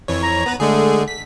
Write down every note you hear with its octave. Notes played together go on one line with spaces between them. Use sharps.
F2 E3 C#5
A#5
B3 B4
D3 G#3 A3 G#4
B6